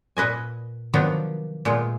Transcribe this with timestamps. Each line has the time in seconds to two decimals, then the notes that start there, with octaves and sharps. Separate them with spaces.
0.17 A#2 B4 D#5 G#5
0.94 C3 D#3 F3 F#3 B3 D4
1.65 A#2 G#3 A3 B3